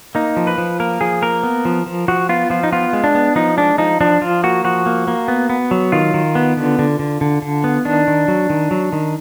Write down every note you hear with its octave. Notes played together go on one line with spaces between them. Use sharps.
A#3 D#4
F3
B4
F3
A#3 A#4
F3 G#4
A#3 A#4
B3
F3
F3
F3 F#4
B3 F4
F3 F4
D#4
B3 F4
G#3
D4
B3
F3 D#4
G#3 D4
F3 D#4
F3 D4
F3 F4
A#3 F#4
F3 F#4
A#3
A#3
B3
B3
F#3
D#3 F4
D#3
B3
D3
D3
D3
D3
D3
B3
D#3 D4
D#3
F#3
D#3
F#3
D#3